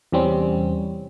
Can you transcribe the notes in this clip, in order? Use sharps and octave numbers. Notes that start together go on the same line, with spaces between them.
E2 C3 G3 C4 C#4